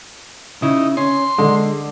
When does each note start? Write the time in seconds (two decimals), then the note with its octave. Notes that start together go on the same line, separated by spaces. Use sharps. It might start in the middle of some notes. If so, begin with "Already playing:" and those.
0.62 C#3 D#4 E4
0.97 C#4 C6
1.38 D3 G#3